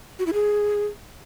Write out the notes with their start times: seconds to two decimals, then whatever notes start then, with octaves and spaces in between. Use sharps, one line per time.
0.19 F#4
0.26 E4
0.33 G#4